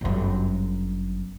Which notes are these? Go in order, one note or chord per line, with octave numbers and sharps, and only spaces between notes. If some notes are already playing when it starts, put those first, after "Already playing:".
G1 F#2